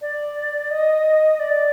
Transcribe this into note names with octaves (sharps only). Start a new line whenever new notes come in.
D5
D#5
D5